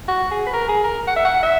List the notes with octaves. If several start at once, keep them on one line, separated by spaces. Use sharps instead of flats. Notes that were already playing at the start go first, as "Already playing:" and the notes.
F#4
G#4
B4
A#4
G#4
A#4
F#5
E5
F#5
E5